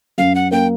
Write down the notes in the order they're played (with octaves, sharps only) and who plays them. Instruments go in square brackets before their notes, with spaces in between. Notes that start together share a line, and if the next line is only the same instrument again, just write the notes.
[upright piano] F#2 [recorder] F5
[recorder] F#5
[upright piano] A#3 [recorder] G5